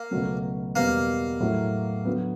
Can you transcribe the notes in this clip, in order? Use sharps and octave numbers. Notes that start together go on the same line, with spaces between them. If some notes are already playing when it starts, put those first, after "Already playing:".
Already playing: A#3
C#2 B2 F#3 A3
E2 B2 G3 A#3 B3
A2 F#3 A3
D3 F#3 B3